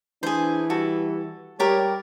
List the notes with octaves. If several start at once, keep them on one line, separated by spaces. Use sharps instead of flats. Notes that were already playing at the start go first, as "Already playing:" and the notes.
E3 D4 G#4 C5
G3 F#4 A4
G3 G4 A#4 C#5 D5